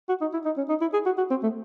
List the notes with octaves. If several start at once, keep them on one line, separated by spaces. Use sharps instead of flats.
F#4
D#4
E4
D#4
C#4
D#4
E4
G#4
F#4
F#4
C4
A3